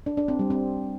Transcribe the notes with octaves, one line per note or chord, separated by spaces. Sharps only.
D4
D4
C4
G3
C4